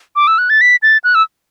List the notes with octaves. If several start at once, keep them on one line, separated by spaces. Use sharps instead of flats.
D6
E6
F#6
A6
B6
A6
F#6
E6